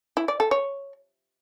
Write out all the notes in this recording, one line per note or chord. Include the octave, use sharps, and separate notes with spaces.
E4
D5
A4
C#5